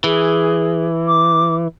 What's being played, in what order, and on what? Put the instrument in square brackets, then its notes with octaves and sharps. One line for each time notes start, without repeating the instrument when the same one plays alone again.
[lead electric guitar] E3 [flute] G#4
[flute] D6